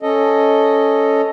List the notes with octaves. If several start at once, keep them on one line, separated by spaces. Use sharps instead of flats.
C#4 A4 D#5